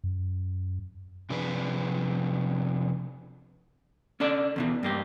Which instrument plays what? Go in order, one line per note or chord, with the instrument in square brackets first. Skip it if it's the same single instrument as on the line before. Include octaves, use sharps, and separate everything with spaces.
[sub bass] F#2
[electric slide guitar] C3 F3 D4 G#4 B4
[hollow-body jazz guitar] C#4 D4 A4 D5
E2 B2 E3
G2 A#3 G4